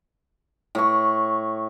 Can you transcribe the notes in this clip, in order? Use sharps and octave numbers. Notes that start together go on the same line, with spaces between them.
A2 C#6